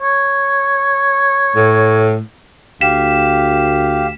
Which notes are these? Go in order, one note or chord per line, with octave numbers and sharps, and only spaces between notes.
C#5
A2
D2 G4 F5 B6 E7